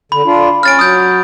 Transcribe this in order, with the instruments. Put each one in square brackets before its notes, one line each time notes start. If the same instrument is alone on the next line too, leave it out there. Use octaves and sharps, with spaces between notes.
[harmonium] D3 [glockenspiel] B5
[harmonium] D4 F4
[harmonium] C#4 [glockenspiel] F6 A6 D7
[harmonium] F#3 [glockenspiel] D#6 G6